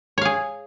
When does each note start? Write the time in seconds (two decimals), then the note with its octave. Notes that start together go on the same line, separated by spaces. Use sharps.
0.18 C#5
0.21 F5
0.25 G#4